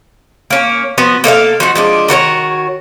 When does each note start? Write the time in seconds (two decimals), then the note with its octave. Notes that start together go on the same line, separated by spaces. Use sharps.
0.50 A#3 C#4
0.98 F3 B3 F#4
1.24 A#3 A4 D#5 F5
1.60 F3 D#4 F#4
1.75 F3 G#3 D4
2.08 D#3 F#4 A#4 C#5